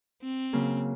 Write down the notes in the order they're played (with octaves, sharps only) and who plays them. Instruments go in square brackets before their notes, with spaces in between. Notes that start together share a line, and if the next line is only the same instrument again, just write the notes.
[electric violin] C4
[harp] C#3 F#3 A#3